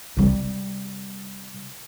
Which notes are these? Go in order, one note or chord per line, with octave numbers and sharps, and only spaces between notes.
C3 G3